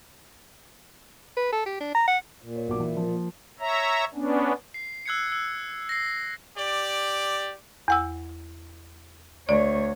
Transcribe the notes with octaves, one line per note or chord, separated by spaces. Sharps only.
B4
A4
G4
D4
A#5
F#5
A#2
C#5
B1 D6
E3
F3 A#3
C#5 E5 A#5
B3 C#4 D4
C7
E6 F#6 G#6 C7 C#7
E6 G#6 C#7
A#6 C7
G4 D5
E2 F#5 E6
D2 C#5 D5